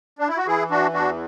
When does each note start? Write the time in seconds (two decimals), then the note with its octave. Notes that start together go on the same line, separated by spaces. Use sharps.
0.19 D4
0.28 E4
0.37 F#4
0.47 E3 E4 G#4
0.71 D4 F#4
0.93 E2 D4 F#4